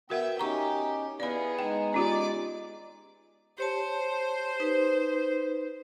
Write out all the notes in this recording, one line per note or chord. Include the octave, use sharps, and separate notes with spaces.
B3 F#4 A#4 E5 F#5 G5
C#4 D#4 G4 A#5 C#6
B3 E4 G#4 D5 F5 B5
G#3 D#4 G5
C#4 F4 G4 D5 D6
G4 C5 C#5 A5
D#4 B4